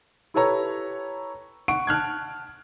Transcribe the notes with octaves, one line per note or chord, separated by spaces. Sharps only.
E4 G4 A4 B4 C#5 A#5
F#5 C#6 D7
A5 F6 F#6 G#6